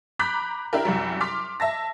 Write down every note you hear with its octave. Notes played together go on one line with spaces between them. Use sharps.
A#5 B5 D6 F#6 G6 B6
D4 E4 G4 A#4
C2 F#2 G3
C6 D6 F6 B6
E5 A5 A#6